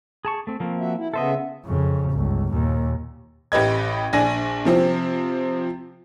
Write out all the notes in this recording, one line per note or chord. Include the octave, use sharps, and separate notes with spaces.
G#4 A5 C#6
A3 C4
F3 A#3 C4
F#4 E5
E4
C#3 B3 A4 C5 D#5 E5
F2 C#3
G1 C#2
D#2 A#2
A1 G4 B4 D#5 G#6
A#1 D4 G#5 A#6
C3 F3 C4